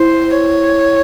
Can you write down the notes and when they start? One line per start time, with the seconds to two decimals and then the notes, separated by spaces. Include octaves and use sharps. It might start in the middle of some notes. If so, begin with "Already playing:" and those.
Already playing: E4 C5
0.37 C#5